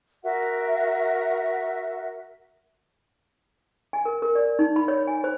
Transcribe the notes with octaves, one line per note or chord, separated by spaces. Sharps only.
F#4 A#4 E5 F#5
G#5
A#4
A#4
D5
D#4
B5
C#5
G#5
C5